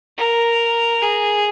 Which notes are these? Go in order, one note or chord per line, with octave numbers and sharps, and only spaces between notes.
A#4
G#4